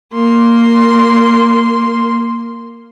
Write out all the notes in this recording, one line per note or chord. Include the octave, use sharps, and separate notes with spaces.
A#3 C6